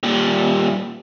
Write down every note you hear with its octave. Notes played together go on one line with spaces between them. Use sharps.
A#2 G3